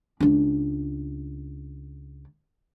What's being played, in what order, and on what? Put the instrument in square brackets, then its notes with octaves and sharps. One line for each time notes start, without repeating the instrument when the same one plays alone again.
[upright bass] C#2 D4